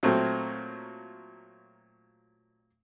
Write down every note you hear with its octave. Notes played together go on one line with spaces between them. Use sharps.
A#2 F#3 A3 C4